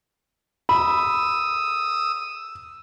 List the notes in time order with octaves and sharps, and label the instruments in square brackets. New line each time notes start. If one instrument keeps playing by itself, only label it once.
[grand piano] B5 [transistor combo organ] D#6 E6